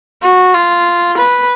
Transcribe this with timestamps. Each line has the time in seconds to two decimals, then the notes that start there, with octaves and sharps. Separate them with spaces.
0.23 F#4
0.54 F4
1.17 B4